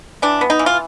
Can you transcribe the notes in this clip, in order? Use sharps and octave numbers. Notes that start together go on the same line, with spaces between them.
E3 D4
B3
D#4
E3
F4